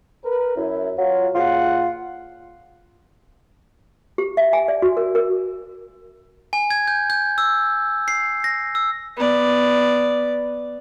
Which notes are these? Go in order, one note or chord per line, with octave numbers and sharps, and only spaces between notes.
A#4 B4
F#2 E4
F#3 F4 F5
A#2 F4 G#4 F#5
G4
E5
G#5
D5
F#4
A#4
A#4
G#5
G#6
G6
G6
E6
C7
A#6
E6
B3 D5